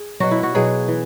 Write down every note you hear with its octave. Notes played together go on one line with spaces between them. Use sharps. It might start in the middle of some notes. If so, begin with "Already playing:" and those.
Already playing: G#4
B2 F#3 F#4
E4
F#4
B2 F#3 G#4
E3